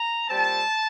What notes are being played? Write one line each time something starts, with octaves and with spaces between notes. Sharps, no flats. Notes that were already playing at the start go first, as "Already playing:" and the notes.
Already playing: A#5
A#2 G3 C4 A5